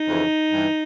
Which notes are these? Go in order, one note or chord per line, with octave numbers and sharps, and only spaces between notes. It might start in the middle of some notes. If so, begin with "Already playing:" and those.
Already playing: D#4
F2 C#3 E3
G2 E3